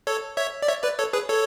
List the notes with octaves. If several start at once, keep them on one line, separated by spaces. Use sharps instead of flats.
A4 C#5
C#5 E5
D5
C#5 E5
B4 D5
A4 C#5
G#4 B4
A4 C#5